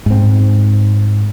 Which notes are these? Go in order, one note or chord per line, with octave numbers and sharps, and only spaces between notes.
G#2 C4